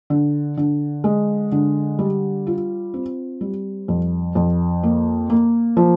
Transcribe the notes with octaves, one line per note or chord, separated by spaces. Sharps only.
D3
D3
G#3
D3
G3
F4
C4
G3
F2
F2
A#3
A#3
F3